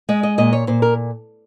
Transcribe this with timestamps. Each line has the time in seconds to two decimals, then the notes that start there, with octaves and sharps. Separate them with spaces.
0.09 G#3 D#5
0.23 D#5
0.38 A#2 D#5
0.53 C#5
0.67 A#2 C5
0.82 A#4